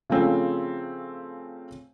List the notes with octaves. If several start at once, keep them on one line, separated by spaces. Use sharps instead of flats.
C#3 F3 A3 C4 C#4